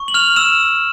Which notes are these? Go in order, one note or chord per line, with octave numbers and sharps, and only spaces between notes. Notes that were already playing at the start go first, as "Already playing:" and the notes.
Already playing: C#6
F#7
F6 F7
E6 F6 E7